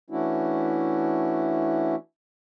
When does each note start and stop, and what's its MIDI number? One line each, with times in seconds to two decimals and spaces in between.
0.10 1.95 52
0.10 1.95 57
0.10 1.95 61
0.10 1.95 62
0.10 1.95 64
0.10 1.95 66